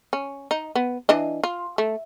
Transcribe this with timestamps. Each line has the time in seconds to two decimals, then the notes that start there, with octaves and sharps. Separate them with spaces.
0.13 C#4
0.51 D#4
0.75 B3
1.09 E3 D4 D#5
1.44 F4
1.78 A3